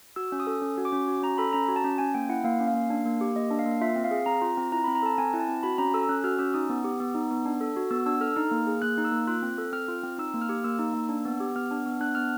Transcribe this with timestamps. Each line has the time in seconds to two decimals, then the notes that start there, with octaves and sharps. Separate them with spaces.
0.16 F#4 E6
0.32 C#4
0.40 D#6
0.47 A4
0.62 C#4
0.78 F#4
0.85 D6
0.92 C#4
1.08 F#4
1.23 C#4 A#5
1.38 A4 B5
1.53 C#4 A#5
1.68 F#4
1.76 A5
1.84 C#4
1.98 C#4 G#5
2.14 A#3 G5
2.29 E4 F#5
2.44 A#3 F5
2.60 C#4
2.67 F5
2.74 A#3
2.90 D4
3.05 A#3
3.21 G4
3.36 A#3 D#5
3.51 D4
3.59 F5
3.66 A#3
3.81 F4 E5
3.96 C4
4.04 F5
4.11 G#4
4.26 C4 A#5
4.42 F4
4.57 C4
4.72 E4 A#5
4.84 C4 B5
4.95 A#5
5.03 A4 A5
5.18 C4 G#5
5.33 E4
5.40 A5
5.48 C4
5.63 F#4 B5
5.78 C#4 A#5
5.94 A4 E6
6.09 C#4 F#6
6.24 F#4 F6
6.39 C#4 E6
6.54 D#4 D#6
6.69 B3
6.84 G4
7.00 B3
7.15 D#4
7.31 B3
7.46 D4
7.61 A4
7.76 F#4
7.91 B3 E6
8.06 D4 E6
8.21 A4 F6
8.36 D#4 F6
8.51 A#3
8.67 G#4
8.82 A#3 F#6
8.98 D#4
9.05 E6
9.12 A#3
9.27 F4 F#6
9.43 C4
9.58 A4
9.73 C4 F6
9.88 F4
10.03 C4
10.18 D#4 E6
10.34 A#3
10.41 F6
10.49 G4
10.64 A#3 E6
10.79 D#4
10.94 A#3
11.09 D4
11.25 B3
11.40 G4
11.56 B3 F6
11.71 D4
11.86 B3
12.00 D4 F#6
12.15 B3 F6